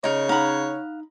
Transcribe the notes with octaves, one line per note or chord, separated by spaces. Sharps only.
C#3 D#4 A#4 C#5
D#4 F5 F#5 B5